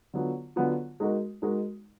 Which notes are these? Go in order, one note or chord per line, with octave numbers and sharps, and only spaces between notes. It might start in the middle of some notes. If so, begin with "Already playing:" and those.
D3 F#3 B3 F4
D3 F#3 B3 F4
G#3 D#4 F#4 A#4
G#3 D#4 F#4 A#4